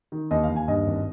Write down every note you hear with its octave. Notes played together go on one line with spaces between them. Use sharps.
D#3
D#2 D#5
F5
D#2
G#5
G2 D#5
G#1